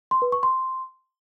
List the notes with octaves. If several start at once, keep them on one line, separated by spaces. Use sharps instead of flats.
C6
B4
C#6
C6